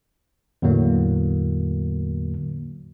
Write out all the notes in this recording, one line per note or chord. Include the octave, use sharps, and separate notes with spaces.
E2 A2 D3 F#3 A#3